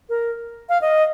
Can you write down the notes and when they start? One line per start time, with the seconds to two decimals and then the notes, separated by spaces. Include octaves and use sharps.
0.09 A#4
0.69 F5
0.81 D#5